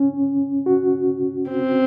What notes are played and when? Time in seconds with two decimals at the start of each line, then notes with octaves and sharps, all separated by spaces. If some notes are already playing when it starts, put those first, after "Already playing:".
Already playing: C#4
0.66 F#4
1.51 C4